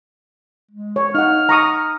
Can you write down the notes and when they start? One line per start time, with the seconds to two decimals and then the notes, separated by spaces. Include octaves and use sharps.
0.71 G#3
0.96 C#5
1.15 D#4 F#5 F6
1.49 A#5 C#6 D#6